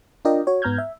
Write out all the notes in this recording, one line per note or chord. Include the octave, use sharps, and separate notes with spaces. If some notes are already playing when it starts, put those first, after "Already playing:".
D4 F4 A#4 D5 D#5 G5
F#4 C#5
G#2 B3 A#5 F6 G6 G#6
E5